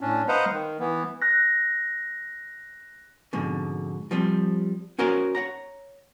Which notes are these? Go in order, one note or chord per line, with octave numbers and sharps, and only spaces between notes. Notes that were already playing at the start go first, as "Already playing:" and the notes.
A2 C#4 D4
B4 C5 D#5 F5 F#5 A#5
D#3
E3 B3
F#6 A#6
F2 G#2 B2 D3
F3 G3 C4
C#4 F#4 A#4 C5 C#5
C#5 F#5 A#5